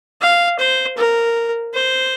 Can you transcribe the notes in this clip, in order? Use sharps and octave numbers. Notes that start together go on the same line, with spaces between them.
F5
C5
A#4
C5